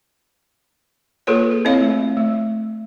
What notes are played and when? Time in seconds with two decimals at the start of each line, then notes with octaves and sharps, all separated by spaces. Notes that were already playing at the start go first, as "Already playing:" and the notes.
1.27 A#3 F4 G#4 A4 B4 C#5
1.51 A4
1.65 C4 E4 C#5 D#5 F5
1.81 A3
2.17 A3